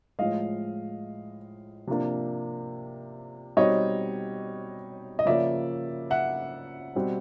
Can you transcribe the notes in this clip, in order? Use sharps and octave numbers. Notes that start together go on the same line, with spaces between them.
A2 F3 G#3 D#5 F5
C3 F3 A#3 D4
B2 G3 C4 D#4 C#5 D#5
D#5
C#3 F3 A#3 D5 E5
E5 F#5
B2 G3 C4